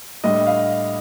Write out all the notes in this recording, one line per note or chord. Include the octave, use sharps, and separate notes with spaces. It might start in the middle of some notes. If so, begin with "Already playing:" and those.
A2 G3 D4 D#5
F5